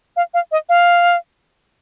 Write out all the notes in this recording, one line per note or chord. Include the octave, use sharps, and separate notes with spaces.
F5
F5
D#5
F5